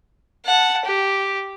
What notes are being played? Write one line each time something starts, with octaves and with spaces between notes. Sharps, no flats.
F#5 A5
G4